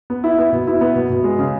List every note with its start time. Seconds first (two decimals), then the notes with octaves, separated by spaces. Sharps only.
0.10 B3
0.24 E4
0.38 B3
0.53 B2
0.67 E4
0.81 B3
0.96 B2
1.10 B2
1.24 G#3
1.39 C#3